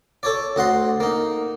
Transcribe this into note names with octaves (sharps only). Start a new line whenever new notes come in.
A4 C#5 D5
D2 D#5 F#5 C6
A#3 D#4